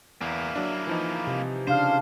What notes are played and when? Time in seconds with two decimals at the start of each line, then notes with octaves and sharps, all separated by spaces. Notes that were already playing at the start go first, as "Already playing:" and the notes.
0.21 E2 A#3 E4
0.56 F#3 D4
0.87 E3 F3 D#4
1.27 C3
1.67 C#3 D4 C5 F5